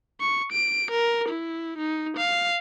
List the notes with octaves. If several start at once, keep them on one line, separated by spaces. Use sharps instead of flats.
C#6
D7
A#4
E4
D#4
F5